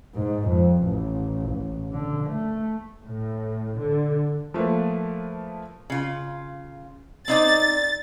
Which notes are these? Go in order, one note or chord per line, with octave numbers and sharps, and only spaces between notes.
G#2
F2
A1
A1
D3
A3
A2
D3
F3 A3 A#3 B4
C#3 F4
C4 D#4 D5 A6